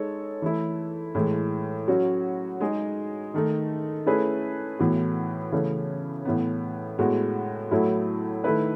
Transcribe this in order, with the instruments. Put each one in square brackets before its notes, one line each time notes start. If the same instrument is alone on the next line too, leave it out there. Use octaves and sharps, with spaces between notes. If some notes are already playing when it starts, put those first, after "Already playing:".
Already playing: [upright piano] G#3 D#4 A4 C#5
E3 A3 E4
A2 E3 G#3
F#3 C#4 F#4
G#3 D#4 G#4
D#3 A3 D#4
A3 C#4 E4 G#4 B4
A2 E3 B3 F#4
C#3 E3 A3 C#4
A2 E3 B3
A2 G#3 B3 F#4
A2 F#3 A3 E4
D#3 A3 E4 B4